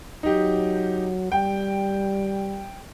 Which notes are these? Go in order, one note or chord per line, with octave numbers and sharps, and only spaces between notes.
F#3 D#4 G4
G3 G5